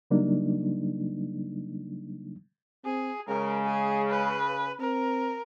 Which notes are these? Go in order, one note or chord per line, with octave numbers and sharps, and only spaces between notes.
C#3 F#3 G3 A#3 D4 D#4
C4 G#4
C#3 G#3 A#4
G#4
B4
C4 A#4